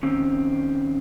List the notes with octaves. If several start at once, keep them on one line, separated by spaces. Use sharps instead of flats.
D#3 C4 C#4